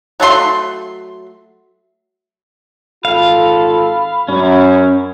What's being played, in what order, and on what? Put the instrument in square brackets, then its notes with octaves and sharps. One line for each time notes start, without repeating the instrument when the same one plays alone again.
[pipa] F#3 A3 G#4 C6
[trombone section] G#1 F4 A4 [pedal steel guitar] F5 [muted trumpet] B5
[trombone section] F#2 [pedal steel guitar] C#4